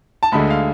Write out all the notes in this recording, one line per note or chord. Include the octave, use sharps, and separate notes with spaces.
A5
D2 D3 G#3 B5
F5